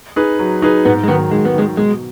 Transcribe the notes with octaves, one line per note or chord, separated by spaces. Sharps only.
D#4 G#4 B4
F#3
D#4 G#4 B4
G#2 B3
G#3
D#3 F#3 B3
G#2 G#3
B3
D#3 F#3 G#3
B2 G#3